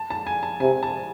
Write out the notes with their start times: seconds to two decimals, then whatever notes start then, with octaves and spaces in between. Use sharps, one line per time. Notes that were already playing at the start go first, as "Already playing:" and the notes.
Already playing: A5
0.10 A5
0.27 G#5
0.43 A5
0.60 C3 G#5
0.83 A5